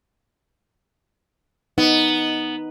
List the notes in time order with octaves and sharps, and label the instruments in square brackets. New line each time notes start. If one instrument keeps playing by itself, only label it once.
[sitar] B3 [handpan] D#4